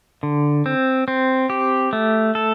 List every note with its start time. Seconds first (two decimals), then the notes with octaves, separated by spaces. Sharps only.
0.23 D3
0.66 C4
1.08 C4
1.50 G4
1.93 A3
2.35 A4